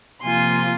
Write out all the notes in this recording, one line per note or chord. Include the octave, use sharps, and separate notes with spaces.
C3 F3 A#3 F4 G#5 C6